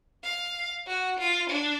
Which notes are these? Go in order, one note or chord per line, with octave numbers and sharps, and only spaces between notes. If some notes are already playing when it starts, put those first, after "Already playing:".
F5
F#4
F4
D4